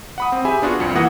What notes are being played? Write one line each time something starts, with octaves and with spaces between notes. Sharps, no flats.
F#5 B5 D#6
C4
G4 G#4 E5 G#5 B5
B3 D4 F4 F#4 G#4
C2 F2 C#7
E3 A#3 F#5 D#6 A#6